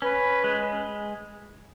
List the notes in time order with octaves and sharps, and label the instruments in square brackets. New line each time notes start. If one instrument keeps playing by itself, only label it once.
[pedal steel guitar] C#4 [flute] B4
[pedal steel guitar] G#3